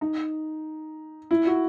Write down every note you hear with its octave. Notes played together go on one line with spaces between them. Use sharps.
D#4
E4
F#4